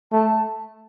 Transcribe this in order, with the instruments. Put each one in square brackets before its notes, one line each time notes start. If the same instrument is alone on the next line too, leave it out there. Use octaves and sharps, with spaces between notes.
[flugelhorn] A3 [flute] A5